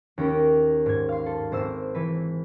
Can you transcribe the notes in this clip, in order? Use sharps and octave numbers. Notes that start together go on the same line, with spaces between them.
D#2 C#4 A#4
G#2 G#6
F5 C6
A4
G#1 C5 C6 E6
E3 B4